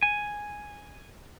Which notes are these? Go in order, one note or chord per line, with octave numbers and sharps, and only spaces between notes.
G#5